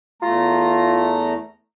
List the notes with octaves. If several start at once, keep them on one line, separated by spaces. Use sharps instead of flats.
E2 A3 F4 A#5